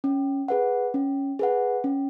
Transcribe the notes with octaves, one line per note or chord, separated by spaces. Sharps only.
C#4
G#4 B4 F#5
C#4
G#4 B4 F#5
C#4